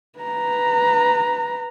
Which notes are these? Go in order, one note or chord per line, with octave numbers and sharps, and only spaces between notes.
B4 A#5